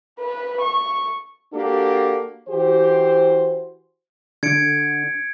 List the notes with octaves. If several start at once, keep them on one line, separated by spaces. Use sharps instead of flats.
B4
C#6
A#3 D4 F#4 G4 A4
E3 F#4 G4 C5
D3 G#6 C#7 D7